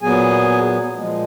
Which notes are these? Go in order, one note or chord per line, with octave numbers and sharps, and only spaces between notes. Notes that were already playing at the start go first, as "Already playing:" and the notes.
A#2 F#3 B3 G#4 G#5
A#2 F3 G#3